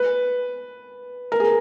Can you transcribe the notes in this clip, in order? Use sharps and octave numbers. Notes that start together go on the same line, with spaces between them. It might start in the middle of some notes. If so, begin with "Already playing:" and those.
Already playing: B4
A#4
G#4